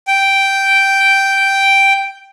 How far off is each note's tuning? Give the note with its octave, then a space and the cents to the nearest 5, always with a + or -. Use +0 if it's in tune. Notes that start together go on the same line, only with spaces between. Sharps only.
G5 -5